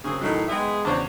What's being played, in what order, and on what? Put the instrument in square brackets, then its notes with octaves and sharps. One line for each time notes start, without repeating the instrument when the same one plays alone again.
[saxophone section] F#2 C4 G#4 [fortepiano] C#3
[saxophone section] A2 D#3 [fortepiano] F#3 D#4
[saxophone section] G#3 B3 G#4 [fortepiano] E5 G5
[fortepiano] E2 C#3 C#5 [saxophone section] D4 F#4 C5